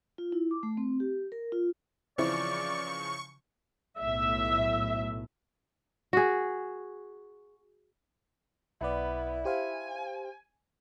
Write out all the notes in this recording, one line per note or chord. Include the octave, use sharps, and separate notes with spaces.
F4
E4
D6
A3
C4
G4
A#4
F4
C#3 E3 F3 C4 E4 D5 C#6
B1 A2 E5
F#4 G#4
B1 B3 E4 D5
G4 C5 F5 G#5